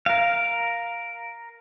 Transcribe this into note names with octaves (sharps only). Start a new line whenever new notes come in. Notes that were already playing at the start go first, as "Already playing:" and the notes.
A#4 F5